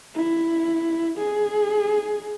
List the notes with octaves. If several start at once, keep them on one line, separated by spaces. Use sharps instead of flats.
E4
G#4